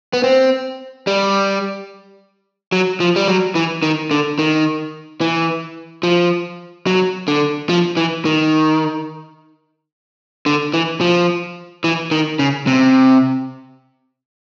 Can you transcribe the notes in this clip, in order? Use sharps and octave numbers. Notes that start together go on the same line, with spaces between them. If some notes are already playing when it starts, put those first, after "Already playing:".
B3
C4
G3
F#3
F3
G3
F#3
E3
D#3
D3
D#3
E3
F3
F#3
D3
F3
E3
D#3
D3
E3
F3
E3
D#3
C#3
C3